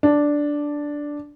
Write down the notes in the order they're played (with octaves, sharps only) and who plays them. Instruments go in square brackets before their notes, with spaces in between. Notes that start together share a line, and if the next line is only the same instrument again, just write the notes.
[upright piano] D4